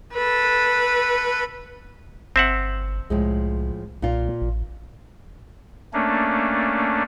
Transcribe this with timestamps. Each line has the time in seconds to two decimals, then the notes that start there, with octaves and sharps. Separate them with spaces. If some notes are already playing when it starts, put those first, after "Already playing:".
0.13 A4 B4
2.36 G1 C4 E5 F#5 A5
3.10 C2 A2 F3 G#3
4.02 B1 A#2 F4
4.41 A1
5.93 A3 A#3 C#4 D4